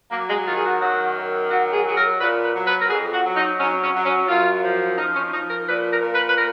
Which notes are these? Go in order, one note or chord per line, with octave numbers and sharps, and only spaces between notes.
F#3 A#3
G#3
D#3 F4
G#4
F#4
F#2 F#4
D#3
F#3 F#4
G#4
F#3 G#4
A#4
A#2 B4
B4
F#3
B4
A#4
F2 G#4
F#4
F#3
D#4
F#3 C#4
C#4
F#3
C#4
F#2 F4
F3
F3 D#4
C#4
F3 D#4
A#4
A#2 B4
A#4
A#2
B4
B4
A#4